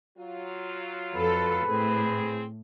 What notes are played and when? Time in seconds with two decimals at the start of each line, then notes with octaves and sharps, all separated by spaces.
0.17 F#3 F4
1.15 F2 A4 B4
1.66 A2 C4 G#4